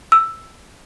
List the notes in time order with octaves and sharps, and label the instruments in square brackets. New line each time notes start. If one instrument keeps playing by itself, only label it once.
[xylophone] E6